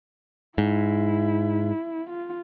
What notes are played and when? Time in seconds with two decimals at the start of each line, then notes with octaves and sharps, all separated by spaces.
0.58 G#2 E4
2.09 F4